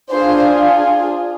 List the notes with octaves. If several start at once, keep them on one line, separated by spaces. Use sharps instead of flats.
D4 F4 G#4 C5